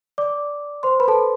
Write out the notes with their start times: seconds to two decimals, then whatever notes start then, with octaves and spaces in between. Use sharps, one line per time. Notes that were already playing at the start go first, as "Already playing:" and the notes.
0.18 D5 D6
0.83 C5 C6
1.00 B4 B5
1.08 A4 A5